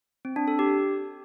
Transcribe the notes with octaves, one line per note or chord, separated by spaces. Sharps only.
C4
D4
A4
G4